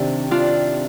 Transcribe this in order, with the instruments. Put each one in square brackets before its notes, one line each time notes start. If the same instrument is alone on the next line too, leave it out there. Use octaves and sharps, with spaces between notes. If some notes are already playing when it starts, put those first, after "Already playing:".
Already playing: [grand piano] C3 D#3 [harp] C4 D4 G4
[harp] D4 F4